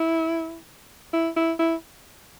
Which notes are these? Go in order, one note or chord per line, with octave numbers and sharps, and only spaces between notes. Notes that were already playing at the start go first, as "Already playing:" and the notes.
Already playing: E4
E4
E4
E4